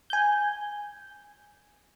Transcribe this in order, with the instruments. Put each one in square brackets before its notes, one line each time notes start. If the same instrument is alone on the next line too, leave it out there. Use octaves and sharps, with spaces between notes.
[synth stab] G#5 G6